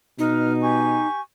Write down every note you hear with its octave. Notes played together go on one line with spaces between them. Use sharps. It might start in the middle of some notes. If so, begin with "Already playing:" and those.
B2 D#4 B4 F6
G4 G#5 C#6